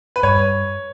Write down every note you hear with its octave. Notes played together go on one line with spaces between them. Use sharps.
B4
G2 C#5